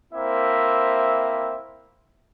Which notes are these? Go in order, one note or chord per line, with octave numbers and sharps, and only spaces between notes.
A#3 C4 E4 C5 E5